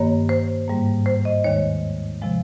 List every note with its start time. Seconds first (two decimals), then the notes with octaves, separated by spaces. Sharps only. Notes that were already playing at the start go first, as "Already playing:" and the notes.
Already playing: G2 D#3 A#3 C#5
0.29 C5
0.68 G#2 G3 A#3
1.06 C5
1.25 D#5
1.44 D#2 D#3 G#3 C#5
2.21 C3 F3 G#3